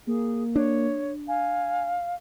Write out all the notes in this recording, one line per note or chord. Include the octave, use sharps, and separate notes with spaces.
A#3 G#4
D4 C#5
F5 G#5